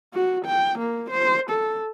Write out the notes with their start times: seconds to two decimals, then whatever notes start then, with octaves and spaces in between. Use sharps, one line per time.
0.14 F#4
0.45 G5
0.79 A#3
1.11 C5
1.51 A4